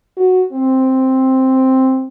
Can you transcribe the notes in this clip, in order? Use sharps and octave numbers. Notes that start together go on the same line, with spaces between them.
F#4
C4